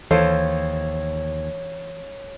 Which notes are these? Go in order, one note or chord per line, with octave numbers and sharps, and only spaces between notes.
D#2 E3 A4 C5 C#5 F5